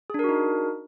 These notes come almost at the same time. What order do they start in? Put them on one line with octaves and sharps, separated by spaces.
G#4 D4 A#4 F#4 D#4